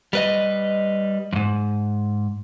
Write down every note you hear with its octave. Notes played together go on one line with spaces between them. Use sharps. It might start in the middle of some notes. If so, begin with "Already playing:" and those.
G3 B4 D#5
F2 G#2